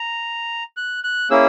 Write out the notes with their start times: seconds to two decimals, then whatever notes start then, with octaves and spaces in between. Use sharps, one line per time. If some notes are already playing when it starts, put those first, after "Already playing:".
Already playing: A#5
0.77 F#6
1.04 F#6
1.30 A#3 C#4 E4 G#4 E6